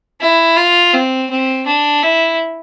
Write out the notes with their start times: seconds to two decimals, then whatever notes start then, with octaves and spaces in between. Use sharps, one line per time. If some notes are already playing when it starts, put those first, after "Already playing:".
0.21 E4
0.57 F4
0.93 C4
1.30 C4
1.67 D4
2.03 E4